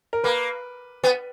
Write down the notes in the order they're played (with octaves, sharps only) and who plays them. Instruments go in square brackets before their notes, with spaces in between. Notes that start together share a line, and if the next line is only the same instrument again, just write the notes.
[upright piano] A#4
[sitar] A#3 [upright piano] B4
[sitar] B3